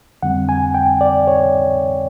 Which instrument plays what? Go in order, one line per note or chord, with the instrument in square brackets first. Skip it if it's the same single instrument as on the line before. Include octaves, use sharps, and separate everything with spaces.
[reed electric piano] F2 D3 G3 C4 F#5
G#5
G5
D5
C#5